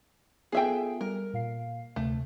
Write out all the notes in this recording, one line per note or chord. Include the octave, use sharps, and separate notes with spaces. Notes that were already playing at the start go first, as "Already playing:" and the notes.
B3 F4 G#4 A4 E5 G5
G3 A#4
A#2 F5 C7
D2 C3 A3